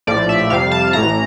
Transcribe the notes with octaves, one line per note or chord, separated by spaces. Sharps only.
A#1 A2 F3 D5
E5
F2 C3 G3 F5
A5
A1 A2 E3 A#5